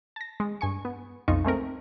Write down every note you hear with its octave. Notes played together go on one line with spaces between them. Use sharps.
A5 A#6
G#3
G2 G#5 C#6
B3
B1 F2 D#4 F4 C#6
G#3 A3 C4 A#4